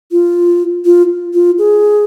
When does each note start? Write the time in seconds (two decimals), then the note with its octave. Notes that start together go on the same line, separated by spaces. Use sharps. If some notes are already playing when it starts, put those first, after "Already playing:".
0.12 F4
0.85 F4
1.34 F4
1.58 G#4